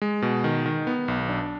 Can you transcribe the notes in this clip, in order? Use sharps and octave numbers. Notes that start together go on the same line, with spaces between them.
G#3
B2
D#3
D#3
B3
B1
D4